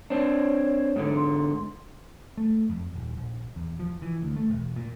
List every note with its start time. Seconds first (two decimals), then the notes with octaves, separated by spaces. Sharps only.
0.10 C4 D4 C#5
0.96 G#2 D3
1.16 C6
2.38 A3
2.70 F2
2.96 D#1
3.17 A#1
3.56 E2
3.79 F3
4.02 E3
4.22 D2
4.36 A3
4.50 E1
4.76 A#2